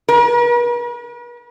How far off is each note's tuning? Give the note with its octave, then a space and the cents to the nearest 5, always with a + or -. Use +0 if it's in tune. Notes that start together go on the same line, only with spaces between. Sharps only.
B4 -45